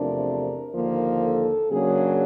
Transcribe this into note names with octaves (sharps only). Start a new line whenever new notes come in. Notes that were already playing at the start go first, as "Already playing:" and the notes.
Already playing: E2 C3 F3 A3 D4 A#4
D#2 D3 F3 A#3
A4
C#3 F#3 A#3 D4 G#4